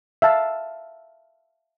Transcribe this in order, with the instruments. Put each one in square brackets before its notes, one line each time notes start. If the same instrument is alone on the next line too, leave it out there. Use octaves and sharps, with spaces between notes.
[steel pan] E5 F5 A5